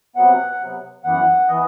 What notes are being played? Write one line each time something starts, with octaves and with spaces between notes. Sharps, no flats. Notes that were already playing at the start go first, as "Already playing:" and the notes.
C3 F#3 B3 F#5
C3 F#3 B3
F#2 E3 B3 F#5
E3 B3 D#5